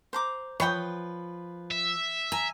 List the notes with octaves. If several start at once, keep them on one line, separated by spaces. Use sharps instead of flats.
C5 A#5 D6
F3 B4 C#5 G5 B5 D#6
E5
G#5 A#5